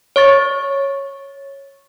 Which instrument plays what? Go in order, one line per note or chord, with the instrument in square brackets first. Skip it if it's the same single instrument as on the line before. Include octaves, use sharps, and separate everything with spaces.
[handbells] C#5 C#6 A6